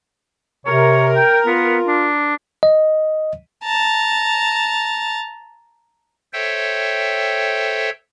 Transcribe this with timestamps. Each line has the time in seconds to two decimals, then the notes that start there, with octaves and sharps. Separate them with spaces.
0.66 C3 A#4 C#5
1.16 G5
1.46 B3 F4
1.88 D4
2.63 D#5
3.64 A5 A#5
6.33 A4 C5 C#5 E5 G5